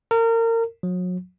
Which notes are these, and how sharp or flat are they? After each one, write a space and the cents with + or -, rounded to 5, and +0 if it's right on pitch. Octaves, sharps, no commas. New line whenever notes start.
A#4 -30
F#3 -35